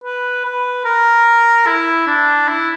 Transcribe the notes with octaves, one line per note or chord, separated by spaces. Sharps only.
B4
B4
A#4
E4
D4
E4